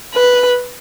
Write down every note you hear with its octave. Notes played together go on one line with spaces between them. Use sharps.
B4